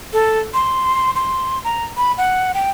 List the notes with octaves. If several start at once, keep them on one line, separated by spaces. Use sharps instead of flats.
A4
C6
C6
A#5
B5
F#5
G5